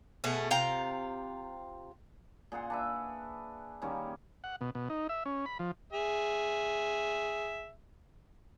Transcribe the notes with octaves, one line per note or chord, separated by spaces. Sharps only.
B2 A3 G#4
C3 F4 G5 A#5
A#2 G#4 F#5 C6
D4 B4 E5
D#3 G3 A#3 C#4
F#5
B2
B2
D#4
E5
C#4
B5
F3
G#4 E5